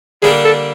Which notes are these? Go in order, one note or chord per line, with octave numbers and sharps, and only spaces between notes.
D3 G3 A#3 D4 G#4
A4